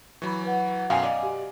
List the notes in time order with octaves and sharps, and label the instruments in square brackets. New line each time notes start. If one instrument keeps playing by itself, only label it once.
[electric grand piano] E3 F#3 [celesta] B5 C#6
[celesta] B4 F#5
[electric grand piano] B1 F#2 B2 [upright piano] F5 G#5
[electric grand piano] D5 [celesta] D#5 D6
[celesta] G4